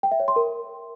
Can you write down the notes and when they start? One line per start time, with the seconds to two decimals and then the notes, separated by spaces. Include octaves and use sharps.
0.03 G5
0.11 E5
0.20 C#5
0.28 C6
0.36 A#4